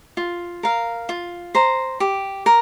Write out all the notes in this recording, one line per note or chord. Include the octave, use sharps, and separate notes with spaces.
F4
A#4 F5
F4
C5 A#5
G4
A#4